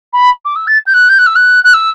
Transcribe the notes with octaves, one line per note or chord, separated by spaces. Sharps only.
B5
D6
E6
A6
G6
F#6
G6
F#6
E6
F#6
F#6
E6